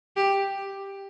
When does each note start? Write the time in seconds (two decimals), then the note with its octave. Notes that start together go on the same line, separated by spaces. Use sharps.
0.17 G4